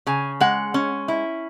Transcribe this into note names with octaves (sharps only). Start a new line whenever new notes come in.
C#3 G#5
G#3 F#5
C#4
E4